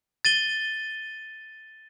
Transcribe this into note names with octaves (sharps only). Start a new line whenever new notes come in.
A6 D#7 G7